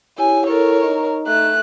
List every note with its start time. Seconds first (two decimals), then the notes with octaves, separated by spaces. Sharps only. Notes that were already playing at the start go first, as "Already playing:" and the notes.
0.18 E4 G4 C#5 G#5
0.46 E4 A4 A#4 C#5
0.81 D#4 D#5 A#5
1.27 A3 F#6